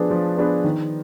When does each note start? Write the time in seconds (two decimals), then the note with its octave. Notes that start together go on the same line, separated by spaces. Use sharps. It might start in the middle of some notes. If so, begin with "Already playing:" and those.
Already playing: F3 B3 D4 G#4 B4
0.11 F3
0.38 B3 D4 G#4 B4
0.64 D#3